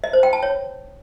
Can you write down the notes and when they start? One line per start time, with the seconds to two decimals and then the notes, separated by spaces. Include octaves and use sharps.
0.04 D#5
0.13 C5
0.23 G5
0.33 A5
0.43 C#5